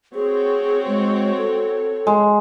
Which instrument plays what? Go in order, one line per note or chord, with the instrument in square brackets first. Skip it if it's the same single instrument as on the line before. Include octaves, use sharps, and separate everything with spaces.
[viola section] C4 F#4 C#5 [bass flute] G#4
[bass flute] G#3
A4
[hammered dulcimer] G#3